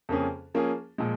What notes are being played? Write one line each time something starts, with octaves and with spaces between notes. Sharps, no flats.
F2 C#3 A#3 C#4 G#4
F3 A#3 C#4 G#4
A#2 F3 G#3